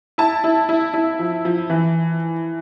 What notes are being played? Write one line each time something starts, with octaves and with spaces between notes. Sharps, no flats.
E4 A5
E4
E4
E4
F3
F3
E3